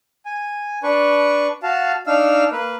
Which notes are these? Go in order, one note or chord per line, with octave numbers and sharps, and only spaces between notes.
G#5
D4 B4 C#6
F#4 F5 A5
D4 D#4 F5 E6 F6
A#3 B4